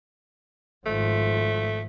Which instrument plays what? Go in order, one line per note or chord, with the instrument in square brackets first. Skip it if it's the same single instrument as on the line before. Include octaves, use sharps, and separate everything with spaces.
[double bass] G#1 F3 [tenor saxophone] A3